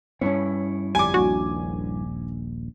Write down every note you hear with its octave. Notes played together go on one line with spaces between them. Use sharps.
G2 C4 C#4 E4 C#5
G1 F2 G3 G#5 D6
D#1 A#1 D4 F#4